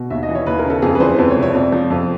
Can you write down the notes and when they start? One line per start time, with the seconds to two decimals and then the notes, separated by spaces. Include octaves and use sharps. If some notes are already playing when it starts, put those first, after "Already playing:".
Already playing: B2
0.10 D#2 E5
0.23 D#5
0.29 E3
0.35 C#5
0.46 D#2 B4
0.59 A#4
0.65 C#3
0.70 A4
0.82 F2 G#4
0.95 B4
1.00 E3 C5
1.18 F2 C5
1.30 C#5
1.36 C3
1.42 C#5
1.54 F2 D5
1.72 F3
1.90 F2